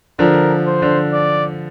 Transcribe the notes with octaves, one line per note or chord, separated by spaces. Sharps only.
D3 F3 A#4
C5
D3
D5